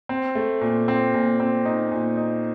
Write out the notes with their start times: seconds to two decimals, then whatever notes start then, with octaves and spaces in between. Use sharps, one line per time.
0.09 C4
0.35 A3
0.61 A#2
0.88 C4
1.14 A#2
1.40 C4
1.65 D#4
1.92 A#2
2.17 D#4